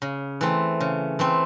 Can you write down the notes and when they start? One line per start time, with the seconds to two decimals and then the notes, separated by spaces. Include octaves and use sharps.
0.02 C#3
0.41 E3 A3 C4
0.80 C#3
1.19 E3 A3 C4